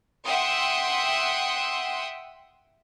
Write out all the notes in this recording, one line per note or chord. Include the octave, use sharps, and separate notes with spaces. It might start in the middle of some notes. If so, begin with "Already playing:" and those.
E5 F#5 G5 C6 D#6